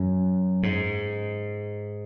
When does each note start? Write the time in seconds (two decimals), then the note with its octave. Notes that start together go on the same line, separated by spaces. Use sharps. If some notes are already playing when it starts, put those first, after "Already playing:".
Already playing: F#2
0.63 G#2